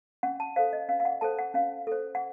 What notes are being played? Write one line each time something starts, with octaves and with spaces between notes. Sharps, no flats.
C#4 F#5
A5
A4 C5 F5
D#5
C#4 F5
F5
F#5
A4 C5 A5
F#5
C#4 F5
A4 C5
F#5